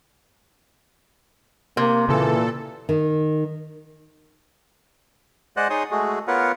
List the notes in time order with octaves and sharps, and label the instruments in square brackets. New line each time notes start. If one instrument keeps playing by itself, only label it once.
[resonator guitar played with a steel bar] C3 [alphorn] A#3
[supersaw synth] A#2 A4 [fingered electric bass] C#3 [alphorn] E3
[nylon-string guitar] D#3
[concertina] G#3 C5 D5 D#5 F#5 F#6
D#4 G#4 C#5 G#5 C6 D#6
G#3 A3 F#4 G#4
B3 F4 A#4 B4 C#5 F#5